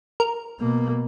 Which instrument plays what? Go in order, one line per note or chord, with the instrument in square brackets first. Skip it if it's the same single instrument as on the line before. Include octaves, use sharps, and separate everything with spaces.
[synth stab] A#4
[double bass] B2 A#3